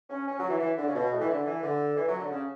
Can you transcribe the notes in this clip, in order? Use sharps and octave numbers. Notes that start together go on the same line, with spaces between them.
C#4
C#4
F#3
E3
E3
D3
C#3
B2
A2
E3
D3
E3
D3
E3
F#3
D3
C#3